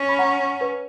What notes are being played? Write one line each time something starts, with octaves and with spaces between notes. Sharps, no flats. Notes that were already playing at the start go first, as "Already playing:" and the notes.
Already playing: C#4
B5
F#5 A#5
B4